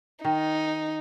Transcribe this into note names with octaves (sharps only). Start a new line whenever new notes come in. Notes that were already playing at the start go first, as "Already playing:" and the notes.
D#3 D#4